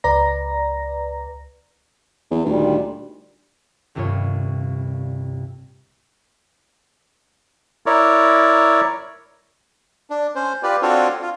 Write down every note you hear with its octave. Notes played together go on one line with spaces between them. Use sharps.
C#2 B4 D5 A#5 A#6
E2
D2 A#2 D#3 G3
D#1 C2 G2 F4 C#5
E4 A#4 C#5 D5
D4
C#4 C5
F4 G4 B4 D5
C4 D4 F4 F#4 A4 C#5
F4